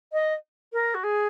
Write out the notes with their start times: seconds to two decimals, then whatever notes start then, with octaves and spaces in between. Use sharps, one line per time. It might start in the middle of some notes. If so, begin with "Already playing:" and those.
0.12 D#5
0.73 A#4
0.94 F#4
1.03 G#4